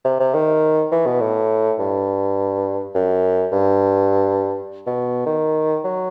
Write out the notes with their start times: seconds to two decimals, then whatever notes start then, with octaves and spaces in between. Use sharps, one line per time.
0.04 C3
0.20 C3
0.34 D#3
0.92 E3
1.06 B2
1.21 A2
1.79 G2
2.95 F#2
3.52 G2
4.86 B2
5.26 D#3
5.84 F#3